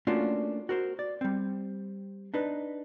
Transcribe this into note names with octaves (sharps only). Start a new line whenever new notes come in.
A3 A#3 C#4 D4 F4 F#4
F#4 A#4 C5
D5
G3 C4
D4 D#4 B4